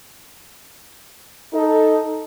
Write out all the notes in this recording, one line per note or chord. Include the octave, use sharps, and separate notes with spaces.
D#4 A4